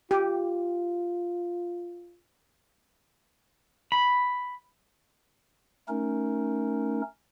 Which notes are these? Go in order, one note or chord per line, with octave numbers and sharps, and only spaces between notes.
F4 G4
B5
A3 C#4 D#4 A#4